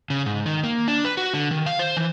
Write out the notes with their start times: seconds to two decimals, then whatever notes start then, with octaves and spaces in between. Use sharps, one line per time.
0.10 C#3
0.26 G#2
0.46 D#3
0.64 A#3
0.88 D4
1.05 B4
1.17 F#4
1.34 D3
1.51 D#3
1.66 F5
1.79 C5
1.97 E3